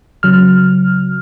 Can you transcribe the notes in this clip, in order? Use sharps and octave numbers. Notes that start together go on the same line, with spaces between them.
C#3 F#3 F6